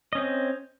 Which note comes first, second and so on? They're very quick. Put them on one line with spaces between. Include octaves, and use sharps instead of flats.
D#5 C#4 C4